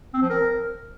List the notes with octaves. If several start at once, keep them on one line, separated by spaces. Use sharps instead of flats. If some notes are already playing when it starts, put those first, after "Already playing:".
C4
F3
A#4